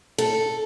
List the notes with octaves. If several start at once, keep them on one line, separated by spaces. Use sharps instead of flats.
A4